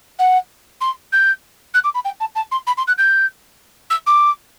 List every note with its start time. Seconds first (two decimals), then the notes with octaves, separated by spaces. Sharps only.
0.19 F#5
0.81 C6
1.12 G6
1.74 F#6
1.84 D6
1.94 B5
2.05 G5
2.20 A5
2.35 A5
2.51 C6
2.67 B5
2.77 C6
2.87 F#6
2.98 G6
3.90 E6
4.06 D6